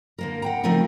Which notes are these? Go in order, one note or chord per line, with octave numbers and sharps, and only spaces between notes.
D3 A#3 A#4
F#5 G5 A#5
C#3 F3 A3 C4 D#4 A#4